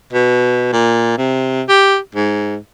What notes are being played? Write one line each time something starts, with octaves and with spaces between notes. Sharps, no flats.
B2
A#2
C3
G4
G#2